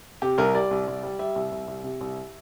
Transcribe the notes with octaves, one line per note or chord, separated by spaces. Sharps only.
C3 G4
C2 A#4
G3 D5
C2
C2
G3
G3 E5
C2
C2
C2
C3
C2